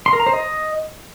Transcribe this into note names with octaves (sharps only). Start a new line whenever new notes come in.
C6
A#4
A#5
C5
D#5